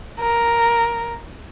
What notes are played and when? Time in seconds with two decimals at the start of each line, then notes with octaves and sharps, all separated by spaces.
0.19 A#4